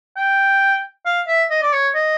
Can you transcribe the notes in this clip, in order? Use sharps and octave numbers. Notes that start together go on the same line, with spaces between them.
G5
F5
E5
D#5
D5
C#5
D#5